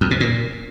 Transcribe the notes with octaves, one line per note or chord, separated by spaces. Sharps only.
F2
B2
A#2